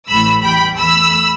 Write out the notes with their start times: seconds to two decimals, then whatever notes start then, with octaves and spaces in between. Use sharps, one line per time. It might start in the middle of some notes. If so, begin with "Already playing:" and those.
0.09 A1 A2 E3 A3 B5 E6
0.43 E2 E3 G3 G5 B5
0.77 E2 E3 A3 B5 E6